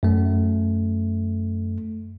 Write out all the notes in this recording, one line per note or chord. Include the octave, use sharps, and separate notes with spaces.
F#2 A3